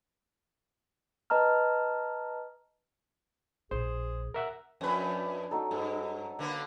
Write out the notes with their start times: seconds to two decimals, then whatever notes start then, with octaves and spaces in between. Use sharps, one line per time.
1.30 B4 D#5 A5 A#5 F6
3.71 A#1 G#4 C5
4.34 A#4 E5 F#5
4.81 F2 C#4 D4 B4
5.51 F#3 D#4 A4
5.71 G2 A4
6.39 D3 A#3 B3